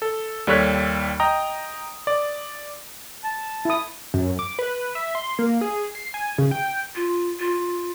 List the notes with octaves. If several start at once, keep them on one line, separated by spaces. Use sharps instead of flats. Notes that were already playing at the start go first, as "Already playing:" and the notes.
A4
D#2 G3 A4 C#5 F#6 B6
D#5 G5 A#5 D#6
D5
A5
E4 D#6
F#2
D6
B4
E5
C6
A#3
G#4
C7
G#5
C#3
G5
F4
F4